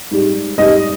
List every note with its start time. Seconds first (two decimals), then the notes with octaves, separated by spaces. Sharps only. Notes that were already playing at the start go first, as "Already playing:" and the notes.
0.11 G#2 G3
0.58 G#2 G3 D#5